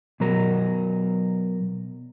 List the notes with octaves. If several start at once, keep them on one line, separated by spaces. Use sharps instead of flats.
B2 F#3 A#4